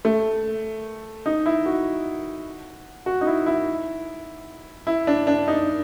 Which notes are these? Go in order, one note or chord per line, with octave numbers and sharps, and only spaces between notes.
A3
D#4
E4
F#4
F#4
D#4
E4
E4
E4
D4
D4
D#4